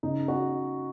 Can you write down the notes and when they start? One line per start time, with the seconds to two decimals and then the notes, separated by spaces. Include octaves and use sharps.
0.03 C#3 D#4
0.28 F#4